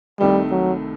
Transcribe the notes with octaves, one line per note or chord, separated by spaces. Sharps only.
C2 C3 D#3 G3 A3 D#4
F#3